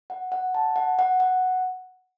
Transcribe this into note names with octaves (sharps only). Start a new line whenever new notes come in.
F#5
F#5
A5
F#5
F#5
F#5